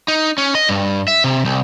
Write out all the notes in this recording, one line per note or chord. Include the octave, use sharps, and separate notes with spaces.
D#4
C#4
D#5
G2
E5
C3
C2